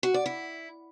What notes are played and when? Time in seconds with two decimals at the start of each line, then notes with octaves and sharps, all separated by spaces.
0.03 F#4
0.14 D5
0.26 E4